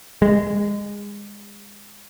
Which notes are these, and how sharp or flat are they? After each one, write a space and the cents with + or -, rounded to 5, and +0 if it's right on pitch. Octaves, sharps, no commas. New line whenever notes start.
G#3 -25